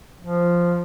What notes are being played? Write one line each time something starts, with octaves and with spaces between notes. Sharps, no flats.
F3